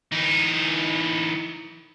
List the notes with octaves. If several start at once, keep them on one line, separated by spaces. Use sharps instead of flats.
E3 D#4